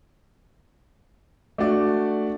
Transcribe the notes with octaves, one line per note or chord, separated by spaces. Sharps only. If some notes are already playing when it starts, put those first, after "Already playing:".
A3 D4 F#4 D5